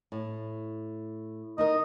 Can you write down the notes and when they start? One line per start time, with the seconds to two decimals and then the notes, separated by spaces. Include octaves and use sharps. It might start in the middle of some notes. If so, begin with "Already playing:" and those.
0.12 A2
1.58 D#3 D#4 A#4 D#5